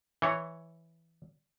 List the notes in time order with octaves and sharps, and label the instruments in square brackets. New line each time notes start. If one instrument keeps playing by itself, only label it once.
[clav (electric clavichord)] E3 C#5